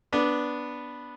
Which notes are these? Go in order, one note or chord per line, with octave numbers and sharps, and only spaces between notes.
B3 D4